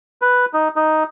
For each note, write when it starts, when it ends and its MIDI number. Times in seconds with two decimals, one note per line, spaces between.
0.22 0.45 71
0.54 0.68 63
0.76 1.03 63